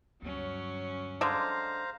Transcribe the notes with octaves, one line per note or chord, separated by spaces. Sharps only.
D2 G2 F#3 C#4
D3 G#3 C5 F5 A#5